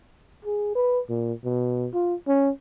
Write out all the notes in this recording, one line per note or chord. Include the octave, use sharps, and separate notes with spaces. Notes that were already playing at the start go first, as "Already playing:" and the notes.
G#4
B4
A#2
B2
F4
C#4